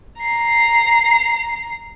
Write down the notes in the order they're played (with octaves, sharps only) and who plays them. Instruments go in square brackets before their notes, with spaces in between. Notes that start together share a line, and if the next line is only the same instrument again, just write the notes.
[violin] A#5 C7